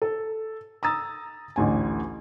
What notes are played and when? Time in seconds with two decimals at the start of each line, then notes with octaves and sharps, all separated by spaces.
0.02 A4
0.83 A#5 D#6 E6 A6
1.56 A1 D2 G#5